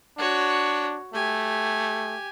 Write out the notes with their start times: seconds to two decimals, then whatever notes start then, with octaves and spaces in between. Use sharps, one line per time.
0.18 D4 F#4 C#5
1.14 A3 G4 G#5